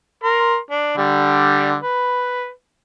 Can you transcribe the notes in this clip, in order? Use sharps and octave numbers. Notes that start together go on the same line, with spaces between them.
A#4 C6
D4
D3 G3
B4